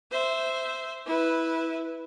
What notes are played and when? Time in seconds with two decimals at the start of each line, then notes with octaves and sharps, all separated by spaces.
0.11 C5 E5
1.06 E4 B4